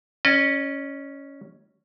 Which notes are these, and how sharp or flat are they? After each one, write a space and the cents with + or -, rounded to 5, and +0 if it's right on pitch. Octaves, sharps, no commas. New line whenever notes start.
C#4 +0 D#5 -40